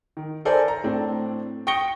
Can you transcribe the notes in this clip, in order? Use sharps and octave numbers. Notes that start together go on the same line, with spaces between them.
D#3
A4 A#4 C5 D5 G#5
A#5
A2 A3 C4 D4
G5 C#6 D#6 A#6 C#7 G7